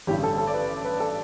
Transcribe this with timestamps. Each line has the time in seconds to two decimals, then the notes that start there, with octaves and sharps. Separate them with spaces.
0.07 A1 G2 D3 G4
0.23 A4
0.38 A4
0.47 D5
0.54 B4
0.85 B4
1.00 A4